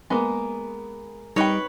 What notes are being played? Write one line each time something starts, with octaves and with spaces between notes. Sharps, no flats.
G#3 A#3 B3
G3 D#4 B4 C#5 G5